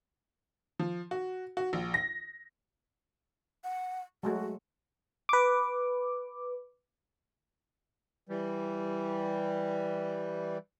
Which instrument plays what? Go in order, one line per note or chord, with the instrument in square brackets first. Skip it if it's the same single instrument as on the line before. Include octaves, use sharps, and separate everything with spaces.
[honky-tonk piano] F3
F#4
F#4
A#1
A#6
[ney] F#5
[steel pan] F#3 G#3 A3 [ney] F#4
[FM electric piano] B4 D6
[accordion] E3 G3